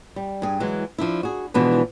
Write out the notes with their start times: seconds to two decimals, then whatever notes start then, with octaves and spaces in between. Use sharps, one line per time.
0.16 G3
0.42 G2 G#4
0.60 E3 F#3 G#3
0.98 F3 D4 E4
1.23 F#4 G#4
1.54 B2 E3 F3 G#3 B3 D4